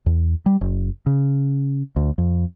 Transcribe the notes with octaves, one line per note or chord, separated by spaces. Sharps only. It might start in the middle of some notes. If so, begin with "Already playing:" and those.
E2
G3
F#1
C#3
D2
F2